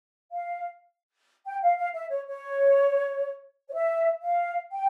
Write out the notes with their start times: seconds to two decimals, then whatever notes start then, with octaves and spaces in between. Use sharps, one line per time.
0.31 F5
1.45 G5
1.62 F5
1.77 F5
1.94 E5
2.10 C#5
2.27 C#5
3.69 C#5
3.74 E5
4.22 F5
4.72 G5